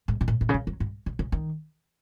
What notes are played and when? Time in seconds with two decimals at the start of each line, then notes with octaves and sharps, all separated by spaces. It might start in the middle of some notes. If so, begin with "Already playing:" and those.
0.08 G#2
0.21 B2
0.28 A2
0.41 A2
0.49 C#3
0.54 D#3
0.67 F#3
0.80 G#2
1.06 C#3
1.19 C#3
1.32 D#3